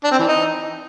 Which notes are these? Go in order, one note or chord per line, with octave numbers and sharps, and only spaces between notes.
D4
C4
E3
D#4